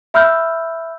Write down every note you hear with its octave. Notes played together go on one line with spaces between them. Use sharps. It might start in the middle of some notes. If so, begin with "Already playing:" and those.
E5 B5 E6 F6 G6